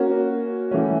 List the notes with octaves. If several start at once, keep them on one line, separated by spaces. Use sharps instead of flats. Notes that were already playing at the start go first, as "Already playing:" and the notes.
Already playing: A#3 C#4 F#4
E3 A3 C#4